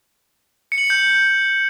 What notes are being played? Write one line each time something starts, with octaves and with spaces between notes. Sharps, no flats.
C#7
F#7
C#7
G6